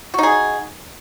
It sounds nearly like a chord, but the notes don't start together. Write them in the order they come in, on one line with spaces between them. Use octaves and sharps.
F#4 D#4 G#4